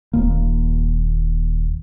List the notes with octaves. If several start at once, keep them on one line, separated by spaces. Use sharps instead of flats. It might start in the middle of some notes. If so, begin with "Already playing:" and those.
D#1 D#2 A#3